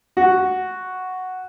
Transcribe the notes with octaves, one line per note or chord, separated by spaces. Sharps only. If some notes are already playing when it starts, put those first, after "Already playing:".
F#4